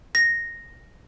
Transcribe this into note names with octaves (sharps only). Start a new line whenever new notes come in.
A#6